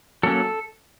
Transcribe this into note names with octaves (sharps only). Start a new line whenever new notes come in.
F#3 A#3 C#4 A4